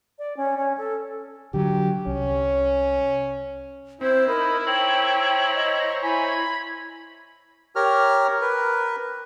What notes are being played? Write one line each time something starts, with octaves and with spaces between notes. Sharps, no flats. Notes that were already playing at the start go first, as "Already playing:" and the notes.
D5
C#4
C#4
A4
D3 F#3 G4
C2 C#4
C4 E4 C5
D#4 A#4 B5
C5 C#5 G5 A#5 F#7
D#5
E4 G#5 B5
G#6
G4 A#4 C#5 A#5 F6
A#4 B4